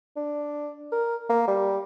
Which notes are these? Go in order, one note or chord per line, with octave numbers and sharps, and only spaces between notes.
D4
A#4
A#3
G3